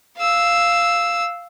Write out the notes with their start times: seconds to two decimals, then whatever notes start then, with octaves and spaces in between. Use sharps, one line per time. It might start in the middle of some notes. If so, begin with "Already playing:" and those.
0.17 F5 E6